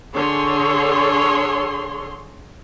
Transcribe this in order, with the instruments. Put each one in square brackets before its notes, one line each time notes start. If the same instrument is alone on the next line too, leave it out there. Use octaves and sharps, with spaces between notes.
[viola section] D3 G#4 C#5 C6